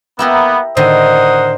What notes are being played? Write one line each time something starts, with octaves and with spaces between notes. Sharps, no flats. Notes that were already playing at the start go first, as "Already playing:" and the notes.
A#3 B3 E4 G4 A#4
A2 D3 D#3 A#4 C5 F#5 D#6